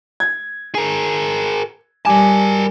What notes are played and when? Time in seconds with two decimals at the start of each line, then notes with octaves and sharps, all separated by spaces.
0.20 G#6
0.75 G#4 A#4
2.05 G3 A#4 G#5 A5 D6